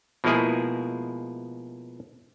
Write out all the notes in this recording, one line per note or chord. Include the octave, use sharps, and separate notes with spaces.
B2 F3 G#3 A#3 E4 G#4